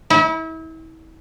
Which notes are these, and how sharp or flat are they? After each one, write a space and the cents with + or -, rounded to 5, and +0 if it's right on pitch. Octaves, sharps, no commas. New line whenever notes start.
E4 -35